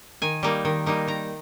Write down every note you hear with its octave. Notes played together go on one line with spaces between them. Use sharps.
D#3 G#5
G3 A#3 D#4
D#3
G3 A#3 D#4
D#3 A#5